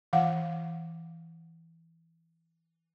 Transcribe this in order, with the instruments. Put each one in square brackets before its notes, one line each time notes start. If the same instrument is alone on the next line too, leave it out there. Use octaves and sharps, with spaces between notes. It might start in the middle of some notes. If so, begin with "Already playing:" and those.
[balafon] E3 F5 F#5